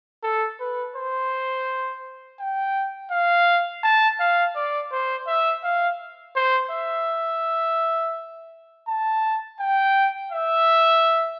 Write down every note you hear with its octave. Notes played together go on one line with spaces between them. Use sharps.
A4
B4
C5
G5
F5
A5
F5
D5
C5
E5
F5
C5
E5
A5
G5
E5